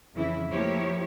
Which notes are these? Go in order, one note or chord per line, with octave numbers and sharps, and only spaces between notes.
F2 C#3 E3 E4
F3 A3 A#3 E4 G4 C#5